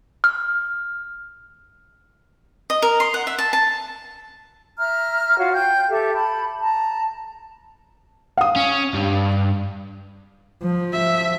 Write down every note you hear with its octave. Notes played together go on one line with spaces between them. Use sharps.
F6
D#5
A#4
C6
F#5
E5
A5
A5
E5 A#5 F6
F4 F#4 C#5 F5
G5 G6
G4 A4 E5
A5 B5
A5 A#5
F5 D#6
C#4
G2
F3
E5